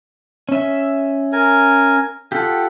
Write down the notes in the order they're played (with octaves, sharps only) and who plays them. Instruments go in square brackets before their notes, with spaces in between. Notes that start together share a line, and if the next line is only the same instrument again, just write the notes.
[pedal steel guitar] C#4 E5
[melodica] A#4 G#5
[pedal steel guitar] F4 G4 [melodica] A4 F#5